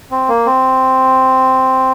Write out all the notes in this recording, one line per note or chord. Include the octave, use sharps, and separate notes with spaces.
C4
A#3
C4